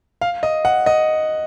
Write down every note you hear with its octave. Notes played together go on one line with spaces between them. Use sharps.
F5
D#5
F#5
D#5